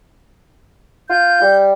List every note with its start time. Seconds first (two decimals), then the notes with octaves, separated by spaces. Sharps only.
1.10 F4 G6
1.42 G3